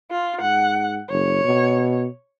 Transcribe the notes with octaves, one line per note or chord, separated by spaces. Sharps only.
F4
G#2 F#5
F#1 C#5
B2